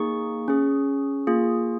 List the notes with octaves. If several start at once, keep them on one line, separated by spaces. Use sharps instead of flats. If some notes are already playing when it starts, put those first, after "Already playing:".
Already playing: A#3 D#4 G#4 C#6
C#4 G#4
A#3 F4 G#4